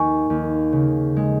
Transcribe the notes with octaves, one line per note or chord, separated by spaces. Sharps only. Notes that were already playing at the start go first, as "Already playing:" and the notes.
Already playing: D#2 G#5 C#6
D#2
C#3
G#3